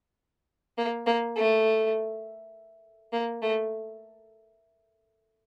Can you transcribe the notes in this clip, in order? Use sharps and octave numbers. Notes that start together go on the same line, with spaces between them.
A#3
A#3
A3
A#3
A3